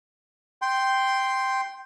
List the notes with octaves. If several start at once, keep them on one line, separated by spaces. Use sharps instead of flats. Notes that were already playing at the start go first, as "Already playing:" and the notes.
G5 C6